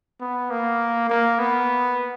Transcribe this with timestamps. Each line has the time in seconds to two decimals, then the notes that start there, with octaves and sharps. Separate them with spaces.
0.20 B3
0.50 A#3
1.10 A#3
1.39 B3